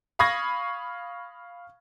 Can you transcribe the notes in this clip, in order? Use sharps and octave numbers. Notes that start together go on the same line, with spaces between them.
F5 B5 C#6 D#6 G#6 A#6